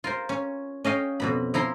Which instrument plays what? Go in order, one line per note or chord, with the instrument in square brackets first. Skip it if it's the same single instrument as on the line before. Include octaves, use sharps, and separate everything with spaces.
[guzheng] F4 A#4 C5
C#4
C#4 D#5 F5 G5
F2 B2 B5
F3 E4 A#5 C6